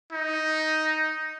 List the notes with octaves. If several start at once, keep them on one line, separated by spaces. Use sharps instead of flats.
D#4